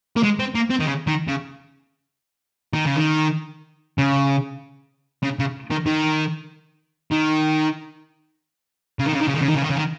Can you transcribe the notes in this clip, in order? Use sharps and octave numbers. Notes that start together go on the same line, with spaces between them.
A#3
G#3
C4
A#3
C4
D#3
C#3
D#3
C#3
D#3
C#3
D#3
C#3
C#3
C#3
D#3
D#3
D#3
C#3
D#3
C#3
D#3
C#3
D#3
C#3
D#3
C#3
D#3
C#3
D#3